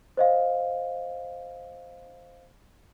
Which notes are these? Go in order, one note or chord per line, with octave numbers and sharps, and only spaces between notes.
C5 D#5 F5